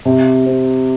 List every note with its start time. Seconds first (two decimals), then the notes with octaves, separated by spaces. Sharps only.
0.05 C3
0.46 C4